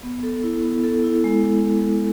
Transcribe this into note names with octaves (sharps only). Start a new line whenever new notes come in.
B3
A4
E4
B3
A4
E4
G#3